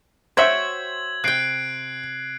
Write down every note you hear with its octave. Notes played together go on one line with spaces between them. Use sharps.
F#4 C5 C#5 E5 G5 G#6 F#7
C3 G5 F#6 C7 D7